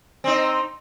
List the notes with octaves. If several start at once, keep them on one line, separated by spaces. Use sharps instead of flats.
C4 D#4